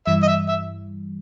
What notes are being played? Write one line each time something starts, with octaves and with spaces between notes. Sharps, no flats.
G2 E3 G3 E5
D#5
E5
E5